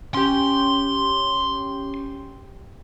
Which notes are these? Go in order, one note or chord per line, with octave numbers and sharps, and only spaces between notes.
C#4 G4 C6